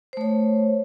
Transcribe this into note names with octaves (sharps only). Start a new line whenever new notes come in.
A3 C5 C#5